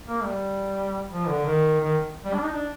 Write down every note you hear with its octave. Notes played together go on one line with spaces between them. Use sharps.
A#3
G3
F3
D3
D#3
D#3
G3
D4
D#4
D4